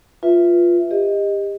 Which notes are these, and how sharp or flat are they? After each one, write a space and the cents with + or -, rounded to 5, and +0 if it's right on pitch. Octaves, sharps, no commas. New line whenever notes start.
F4 +0 B4 +0 E5 +5
G4 +30 D#5 +0